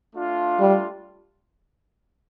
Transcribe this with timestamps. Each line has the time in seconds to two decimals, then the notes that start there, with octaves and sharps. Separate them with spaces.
0.14 A3 D4 F4
0.60 G3